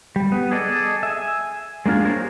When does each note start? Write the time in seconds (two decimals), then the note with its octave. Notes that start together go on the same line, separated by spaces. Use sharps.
0.16 G3
0.32 B3
0.51 G#4 A4 D5 D#5
1.03 E5 G#5
1.86 G#3 A#3 D4 F4 G#4
2.05 G4 G#4 A#4 C5 C#5